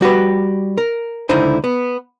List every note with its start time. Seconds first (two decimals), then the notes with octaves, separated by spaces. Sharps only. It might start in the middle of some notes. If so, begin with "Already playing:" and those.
0.01 G3 F#4 G4 B4
0.78 A#4
1.29 C#2 D3 D#4 E4 C5 G#5
1.64 B3